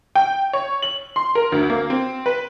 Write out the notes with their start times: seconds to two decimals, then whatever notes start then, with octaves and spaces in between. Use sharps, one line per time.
0.15 G5
0.53 C#5
0.82 F#7
1.16 C6
1.35 A#4
1.52 D2
1.70 A#3
1.90 C4
2.26 B4